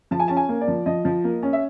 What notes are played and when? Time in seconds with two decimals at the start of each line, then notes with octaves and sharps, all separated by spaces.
0.11 F3 A5
0.20 G#5
0.28 C#4 A5
0.37 G#5
0.49 A#3
0.61 D5
0.68 F3
0.86 F3 D#5
1.05 F3
1.24 A#3
1.43 C#4
1.53 E5